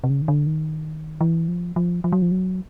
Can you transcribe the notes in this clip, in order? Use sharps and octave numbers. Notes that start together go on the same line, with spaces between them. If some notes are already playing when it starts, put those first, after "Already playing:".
C3
C#3
D#3
D3
D#3
E3
F3
F3
F3
F#3
F3
F#3